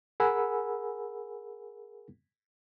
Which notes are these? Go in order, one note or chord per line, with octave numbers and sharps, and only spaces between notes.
G#4 A#4 F#5 G#5 B5 E6